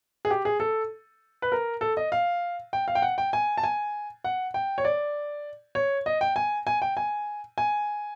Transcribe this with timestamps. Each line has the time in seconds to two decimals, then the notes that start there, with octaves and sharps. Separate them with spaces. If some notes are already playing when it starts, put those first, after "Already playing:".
0.25 G#4
0.31 G4
0.45 G#4
0.60 A4
1.42 B4
1.52 A#4
1.81 A4
1.97 D#5
2.12 F5
2.73 G5
2.88 F5
2.95 G5
3.02 F#5
3.18 G5
3.33 G#5
3.57 A5
3.63 G#5
4.24 F#5
4.54 G5
4.78 C#5
4.85 D5
5.75 C#5
6.06 D#5
6.21 G5
6.36 G#5
6.67 G#5
6.82 G5
6.97 G#5
7.58 G#5